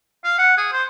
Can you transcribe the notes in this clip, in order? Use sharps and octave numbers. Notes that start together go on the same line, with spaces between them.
F5
F#5
G#4
C5